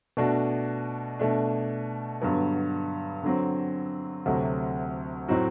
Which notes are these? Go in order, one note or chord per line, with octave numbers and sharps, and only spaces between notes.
B2 A3 D4 F#4
B2 A3 D4
G2 D3 F#3 B3
D3 F#3 C4
D2 C3 F#3 A3
A2 F#3 C4 F#4